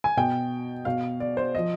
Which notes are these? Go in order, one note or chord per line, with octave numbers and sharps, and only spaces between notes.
G#5
B2 G5
B2 F5
D5
C5
F3 D#5